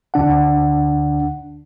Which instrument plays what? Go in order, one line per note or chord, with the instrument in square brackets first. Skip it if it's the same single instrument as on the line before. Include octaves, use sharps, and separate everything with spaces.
[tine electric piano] D2 D3 D4 F#5